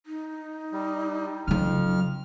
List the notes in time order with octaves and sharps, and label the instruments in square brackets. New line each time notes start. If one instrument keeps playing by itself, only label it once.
[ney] D#4
[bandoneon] G3
[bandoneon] F2 F6 [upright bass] C#3 F#3